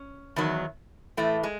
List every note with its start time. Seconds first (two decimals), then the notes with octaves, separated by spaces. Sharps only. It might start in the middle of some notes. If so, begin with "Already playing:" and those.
Already playing: C#4
0.36 E2 D#3 F#3
1.17 A2 E3 A3
1.43 G#3